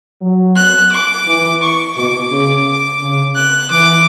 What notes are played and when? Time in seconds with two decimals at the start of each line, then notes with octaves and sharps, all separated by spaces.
0.21 F#3
0.56 F#6
0.92 D6
1.27 E3
1.62 C#6
1.96 B2 D6
2.31 C#3
3.01 C#3
3.36 F#6
3.71 E3 D6